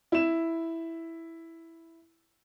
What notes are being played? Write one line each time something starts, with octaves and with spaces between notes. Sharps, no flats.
E4 E7